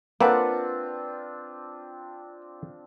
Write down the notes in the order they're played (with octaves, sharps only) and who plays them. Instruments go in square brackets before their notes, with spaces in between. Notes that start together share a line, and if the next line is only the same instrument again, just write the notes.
[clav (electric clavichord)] A#3 [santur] C4 D4 F4 [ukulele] A4 B4 F#5